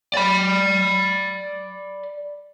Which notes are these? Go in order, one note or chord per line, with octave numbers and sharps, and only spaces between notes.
D5 B5